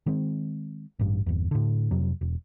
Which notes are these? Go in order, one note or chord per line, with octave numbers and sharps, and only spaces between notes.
D#3 G#3 C4
A1 G2
G1 E2
A2 D3
F2 C3 F#3
E1